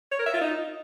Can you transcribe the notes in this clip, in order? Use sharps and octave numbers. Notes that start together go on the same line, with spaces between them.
C#5
A#4
E5
F4
D#4